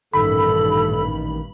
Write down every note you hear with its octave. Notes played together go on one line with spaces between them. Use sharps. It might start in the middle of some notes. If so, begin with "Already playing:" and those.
A1 G2 A#2 D#3 A4 B5